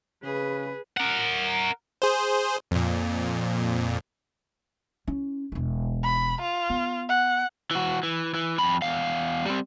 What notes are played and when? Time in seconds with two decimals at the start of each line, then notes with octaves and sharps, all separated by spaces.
0.24 C#3 G#4 B4
0.97 A#4 F#5
2.02 G#4 C5
2.71 F2 A#2
5.07 C#4 E4
5.52 E1 E4
6.04 B5
6.41 F4
6.70 B3
7.09 F#5
7.71 E3 F#4
8.03 E3
8.34 E3
8.58 F2 B5
8.82 E2 F5
9.46 G3 C4